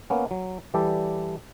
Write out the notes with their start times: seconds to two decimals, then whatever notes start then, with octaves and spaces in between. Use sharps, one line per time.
0.10 A#3 B3 C#4
0.31 F#3
0.74 E3 G3 G4 A4 D5